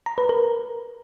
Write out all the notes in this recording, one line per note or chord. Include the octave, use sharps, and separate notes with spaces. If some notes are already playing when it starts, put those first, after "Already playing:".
A#5
B4
A#4